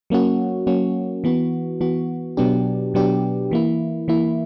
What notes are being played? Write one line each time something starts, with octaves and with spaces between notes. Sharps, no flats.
F#3 A#3 C#4 F#4
F#3 A#3 C#4 F#4
E3 B3 F#4
E3 B3 F#4
B2 F#3 B3 D4 G4
B2 F#3 B3 D4 G4
E3 A#3 E4
E3 A#3 E4